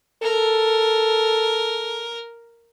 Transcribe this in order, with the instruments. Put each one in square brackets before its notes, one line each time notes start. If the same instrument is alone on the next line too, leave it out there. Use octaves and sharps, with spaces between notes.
[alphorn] A4 [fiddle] A#4